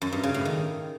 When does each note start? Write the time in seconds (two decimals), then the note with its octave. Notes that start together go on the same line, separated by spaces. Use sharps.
0.02 F#2
0.12 G2
0.23 C#3
0.34 A2
0.45 D#3